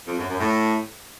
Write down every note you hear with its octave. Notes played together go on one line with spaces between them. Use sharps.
F2
F#2
F#2
A2